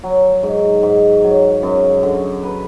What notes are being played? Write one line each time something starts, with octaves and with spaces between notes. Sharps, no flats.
F#3
G#2
G#2
F#3
F#2
D3
B4